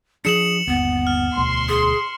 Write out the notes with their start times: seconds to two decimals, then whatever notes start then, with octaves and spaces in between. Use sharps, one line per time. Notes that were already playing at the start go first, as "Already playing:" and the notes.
0.25 F3 D4 G#4 C#7 E7 F#7
0.67 G1 D#2 B3
1.07 F6
1.36 E1 D2 B2 C6
1.69 G#4